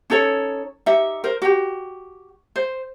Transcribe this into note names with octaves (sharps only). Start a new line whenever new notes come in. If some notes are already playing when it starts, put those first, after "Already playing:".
C#4 D#4 A4 C#5
D#4 G4 E5
A#4 C5
F#4 G4
C5